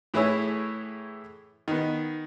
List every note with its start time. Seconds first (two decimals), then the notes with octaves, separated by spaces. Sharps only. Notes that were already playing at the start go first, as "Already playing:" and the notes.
0.14 A2 E3 E4 G#4 C#5 E6
1.68 D#3 B3